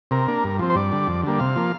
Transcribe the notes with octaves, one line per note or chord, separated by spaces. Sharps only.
C3 A#4
A#3 D4
G2
F3 C4
C5
G2 D5
D3 G3
F2
D3 G3 A#3
C3 F5
F3 A#3